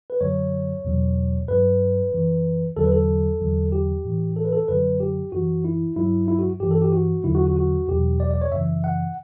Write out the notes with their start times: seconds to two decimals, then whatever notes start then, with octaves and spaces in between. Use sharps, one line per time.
0.10 B4
0.21 F#2 D3 F#3 C#5
0.85 E2 B2 F#3
1.48 G2 F#3 B4
2.12 F#2 E3
2.76 E2 D3 F#3 A4
2.84 B4
2.92 A4
3.41 E2 D3 F#3
3.72 G4
4.04 A2 E3
4.36 A4
4.45 B4
4.53 A4
4.68 F#2 D3 F#3 B4
5.00 G4
5.32 F#2 E3 F#4
5.64 E4
5.96 G2 F#3 E4
6.28 E4
6.39 F#4
6.60 G2 E3 G4
6.71 A4
6.82 G4
6.92 F#4
7.24 E2 D3 F#3 E4
7.35 F#4
7.46 F#4
7.56 F#4
7.88 E2 B2 F#3 G4
8.20 D5
8.31 D5
8.41 C#5
8.52 F#2 C#3 E3 E5
8.84 F#5